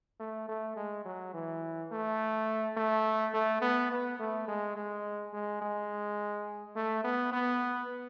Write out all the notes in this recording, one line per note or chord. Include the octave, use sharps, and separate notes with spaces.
A3
A3
G#3
F#3
E3
A3
A3
A3
B3
B3
A3
G#3
G#3
G#3
G#3
A3
B3
B3